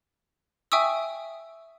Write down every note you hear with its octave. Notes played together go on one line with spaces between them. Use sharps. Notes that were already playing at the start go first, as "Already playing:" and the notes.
E5 G5 G#5 C#6 D#6 E6